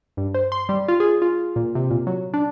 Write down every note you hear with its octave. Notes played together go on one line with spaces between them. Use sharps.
G2
C5
C6
G3
F4
G#4
F4
A#2
C3
A#2
F#3
D4